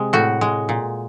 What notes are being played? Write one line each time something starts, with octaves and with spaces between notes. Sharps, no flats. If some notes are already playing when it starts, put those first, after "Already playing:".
Already playing: C3 G#3
A2 F#4
G#3
A#2